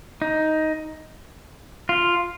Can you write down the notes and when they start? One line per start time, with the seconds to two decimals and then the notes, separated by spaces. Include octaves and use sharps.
0.22 D#4
1.89 F4